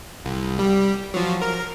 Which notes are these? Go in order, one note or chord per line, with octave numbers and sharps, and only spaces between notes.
C2
G3
F3 F#3
A#4